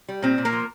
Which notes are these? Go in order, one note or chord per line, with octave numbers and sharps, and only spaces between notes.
G3
A#2 C4
A#2
A#3 A#4
F3